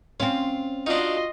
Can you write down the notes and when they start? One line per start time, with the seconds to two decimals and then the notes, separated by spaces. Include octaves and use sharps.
0.20 C4 C#4 F4
0.87 D4 D#4 F4 F#4 D#5 C6